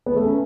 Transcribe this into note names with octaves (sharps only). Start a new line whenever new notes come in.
B3
A3
C#4